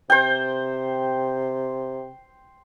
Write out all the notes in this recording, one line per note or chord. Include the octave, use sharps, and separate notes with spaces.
C3 C5 G5